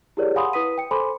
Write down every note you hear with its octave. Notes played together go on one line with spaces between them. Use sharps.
E4 G4 G#4 A#4 C#5 D5
F5 F#5 G#5 B5 C6 D#6
E4 B4 D#6 B6 D#7
G5 C#7
A4 C5 G#5 B5 C6 D6